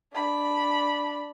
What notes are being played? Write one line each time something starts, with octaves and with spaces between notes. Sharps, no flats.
D4 B5